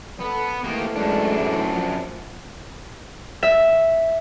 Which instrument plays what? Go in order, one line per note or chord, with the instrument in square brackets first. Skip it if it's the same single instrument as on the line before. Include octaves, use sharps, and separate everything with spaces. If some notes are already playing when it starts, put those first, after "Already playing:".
[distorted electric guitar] B3 [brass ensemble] A4
[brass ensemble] G#2 E3 A3 [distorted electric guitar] A#3 G4
[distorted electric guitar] F#2 D4 [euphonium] G#3
[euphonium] A2
F3
[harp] E5